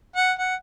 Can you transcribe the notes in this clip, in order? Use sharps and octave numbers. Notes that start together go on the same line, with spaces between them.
F#5
F#5